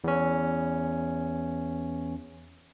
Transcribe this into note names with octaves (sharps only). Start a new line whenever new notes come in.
E2 C#4